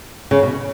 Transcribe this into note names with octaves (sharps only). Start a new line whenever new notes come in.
C#3
B2